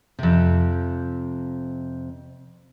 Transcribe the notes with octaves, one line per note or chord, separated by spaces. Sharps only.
F2 C3